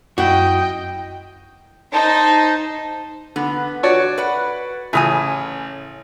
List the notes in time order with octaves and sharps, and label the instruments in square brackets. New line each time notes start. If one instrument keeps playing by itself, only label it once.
[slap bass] F#2 [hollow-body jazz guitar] E4 F#4 [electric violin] D#5 G5
[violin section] D#4 C5 [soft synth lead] A5
[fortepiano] D3 [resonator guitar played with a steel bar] B3
[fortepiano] F#4 C#5 D5
[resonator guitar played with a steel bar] B4 F#5
[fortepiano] A1 D#6 [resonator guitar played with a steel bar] C#3 C5 G#5